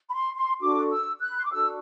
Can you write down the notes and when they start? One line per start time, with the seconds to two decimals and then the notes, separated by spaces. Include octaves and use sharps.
0.09 B5
0.14 C6
0.36 C6
0.60 D4 F#4 A4 D6
0.90 E6
1.21 F#6
1.30 B5
1.37 C6
1.45 D6
1.51 D4 F#4 A4 E6